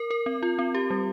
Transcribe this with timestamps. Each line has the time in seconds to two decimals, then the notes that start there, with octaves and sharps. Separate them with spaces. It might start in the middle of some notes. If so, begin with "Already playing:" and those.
Already playing: A#4
0.11 A#4
0.26 C4
0.42 F4
0.59 C4
0.75 G4
0.90 G3